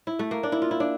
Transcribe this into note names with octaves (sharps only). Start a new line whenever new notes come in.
E4
A3
A#3
D4
E4
F4
E4
D4